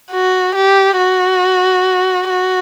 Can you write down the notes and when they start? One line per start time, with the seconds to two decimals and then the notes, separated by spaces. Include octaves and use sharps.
0.12 F#4
0.55 G4
0.98 F#4
2.29 F#4